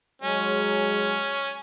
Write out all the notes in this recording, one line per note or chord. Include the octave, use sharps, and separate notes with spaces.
F#3 G#3 C#4